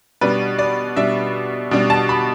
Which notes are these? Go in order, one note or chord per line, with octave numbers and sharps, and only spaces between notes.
B2 G3 D4 B4
D5
B2 G3 D4 E5
B2 G3 D4
A5
B5